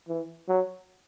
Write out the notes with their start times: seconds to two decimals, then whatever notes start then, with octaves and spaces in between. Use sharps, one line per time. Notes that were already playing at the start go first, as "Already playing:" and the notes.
0.09 E3
0.49 F#3